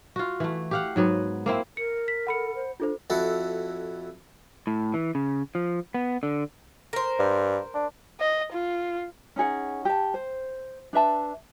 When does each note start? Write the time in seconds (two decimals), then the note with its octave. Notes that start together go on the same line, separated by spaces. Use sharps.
0.16 F4 F#4
0.40 E3 A3
0.71 G4 F5 F#5
0.96 G#2 F#3 B3
1.46 A#3 C4 E4
1.77 A#4 C#7
2.08 B6
2.27 A4 F#5 B5 C#7
2.56 C5
2.80 D4 F4 A4 C5
3.10 F2 E4 F#4 A4
4.67 A2
4.94 E3
5.15 C#3
5.55 F3
5.94 B3
6.23 D3
6.93 A#4 C5
7.19 G2
7.74 D4
8.20 D#5
8.53 F4
9.36 C#4 D#4 G#4 F#5
9.85 G4 A5
10.14 C5
10.93 D4 B4 E5 A5